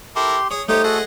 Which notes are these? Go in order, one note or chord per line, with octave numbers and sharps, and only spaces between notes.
E4 G4 A4 A#4 C6
G#4 C#5 D#6
A3 D#4 G4 C5 C#5 D#6
F#4 G#4 A4 D#5 F#5